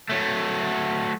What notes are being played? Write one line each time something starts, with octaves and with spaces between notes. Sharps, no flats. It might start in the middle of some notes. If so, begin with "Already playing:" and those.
F#3 A3